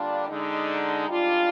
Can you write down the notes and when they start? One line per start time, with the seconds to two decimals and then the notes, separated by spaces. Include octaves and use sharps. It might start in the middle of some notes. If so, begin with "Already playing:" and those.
Already playing: D3 G3 A#3 D4 F4
0.29 D3 G#3 D#4
1.08 G#2 G3 D4 F4